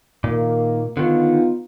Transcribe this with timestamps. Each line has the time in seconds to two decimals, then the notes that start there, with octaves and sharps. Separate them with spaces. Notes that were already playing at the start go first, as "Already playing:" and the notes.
0.24 A#2 D#3 A#3
0.97 D3 D#3 B3 D#4 F4